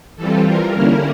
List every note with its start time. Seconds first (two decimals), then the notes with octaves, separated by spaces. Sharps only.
0.16 E3 G3 C4 F4 A4
0.45 A#4
0.74 D3 G3 A#3 C#4 E4